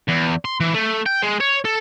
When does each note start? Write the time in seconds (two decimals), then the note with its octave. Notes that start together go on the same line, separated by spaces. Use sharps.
0.09 E2
0.45 C6
0.60 E3
0.74 A3
1.06 G5
1.23 G#3
1.40 C#5
1.65 A4